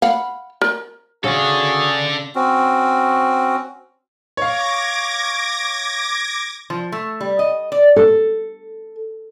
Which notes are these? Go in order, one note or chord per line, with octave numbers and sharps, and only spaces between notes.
F5 F#5 B5
A#4
C#3 F#4 G#4 A4 D5
C4 C#4 F#4
C#5 F5 D6 G#6 A#6
F3
A3
G3
D#5
D5
A4